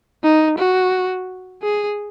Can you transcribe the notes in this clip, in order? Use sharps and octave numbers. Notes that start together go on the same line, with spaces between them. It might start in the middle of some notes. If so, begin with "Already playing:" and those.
D#4
F#4
G#4